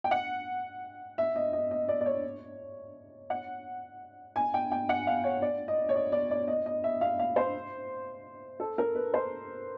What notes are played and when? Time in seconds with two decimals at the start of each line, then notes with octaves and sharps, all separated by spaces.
0.04 G5
0.11 F#5
1.18 E5
1.36 D#5
1.53 D#5
1.71 D#5
1.88 D5
2.01 D5
2.06 C#5
3.30 F#5
4.36 G#5
4.54 G5
4.72 G5
4.89 F#5
5.07 F5
5.24 C#5
5.42 D5
5.68 D#5
5.89 C#5
5.95 D5
6.12 D5
6.31 D5
6.48 D#5
6.66 D#5
6.84 E5
7.01 F5
7.19 F5
7.36 C5
8.60 A4
8.78 A#4
8.95 B4
9.14 C5